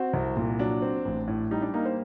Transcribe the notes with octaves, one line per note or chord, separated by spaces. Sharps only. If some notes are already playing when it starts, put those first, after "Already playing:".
Already playing: C4 F#4
C2
A#2
F#3 D4
C4
A1
A2
G3 D#4
D4
A#3 D#4
C5